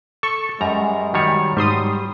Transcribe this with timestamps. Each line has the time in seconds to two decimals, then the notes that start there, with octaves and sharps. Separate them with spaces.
0.23 A4 C#6
0.61 F#2 G3 G#3 A#5
1.14 D#3 F#3 G3 C#5
1.57 G#2 G3 C6 D#6